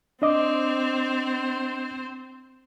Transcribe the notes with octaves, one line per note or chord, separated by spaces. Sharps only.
C4 D4 C5 D#5 D6